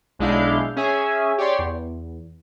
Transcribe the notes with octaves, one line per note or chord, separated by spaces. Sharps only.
B1 G#3 D4 E4 F5 G6
C#4 G#4 E5 G#5
G4 C#5 D5 C6
E2